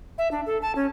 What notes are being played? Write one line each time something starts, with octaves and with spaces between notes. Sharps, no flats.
E5
D4
A4
A5
C#4